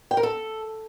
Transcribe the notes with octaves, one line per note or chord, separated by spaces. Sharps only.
G5
A#4
A4